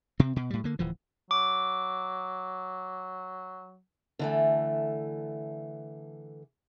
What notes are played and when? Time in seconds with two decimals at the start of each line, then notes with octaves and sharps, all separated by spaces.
0.20 C3 C4
0.36 B2
0.50 A2 G3
0.64 D3 A#3
0.79 D1 E3 F3
1.31 F#3 D6
4.19 D3 E3 A3